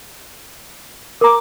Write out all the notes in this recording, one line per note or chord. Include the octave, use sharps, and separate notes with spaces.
A#4 A#5 D6